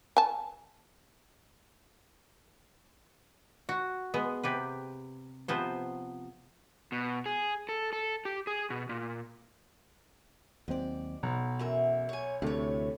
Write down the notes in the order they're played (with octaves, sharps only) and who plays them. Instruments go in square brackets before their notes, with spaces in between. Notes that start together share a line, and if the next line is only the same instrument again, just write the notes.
[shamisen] G#5 A5
[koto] F#4
G#3 B3
C3 G4 B4
C3 F3 B3 C5
[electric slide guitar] B2
G#4
A4
A4
G4
G#4
B2
A#2
[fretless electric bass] D#2 F#3 C4 [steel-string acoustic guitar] G#2 D5
[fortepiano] B1 F#5 A#5 [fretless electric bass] B2
[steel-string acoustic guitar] F#2 E3 E5
C#5 G#5
[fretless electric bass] D2 [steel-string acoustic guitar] A2 C#5 [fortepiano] C3 A3